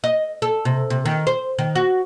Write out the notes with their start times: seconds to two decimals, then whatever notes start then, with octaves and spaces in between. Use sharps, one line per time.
0.04 D#5
0.42 A4
0.65 C3
0.90 C3
1.05 D#3
1.27 C5
1.59 D#3
1.75 F#4